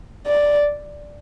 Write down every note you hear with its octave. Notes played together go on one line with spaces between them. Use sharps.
D5